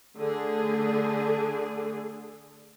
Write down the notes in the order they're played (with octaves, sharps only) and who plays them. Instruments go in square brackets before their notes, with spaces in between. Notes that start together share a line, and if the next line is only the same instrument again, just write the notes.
[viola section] D3 A3 G#4